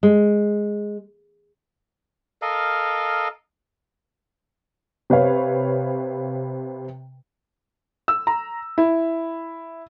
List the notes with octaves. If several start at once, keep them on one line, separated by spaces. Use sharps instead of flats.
G#3
A4 A#4 D#5 F5
C3 B4 C#5 F5
E6
A#5
E4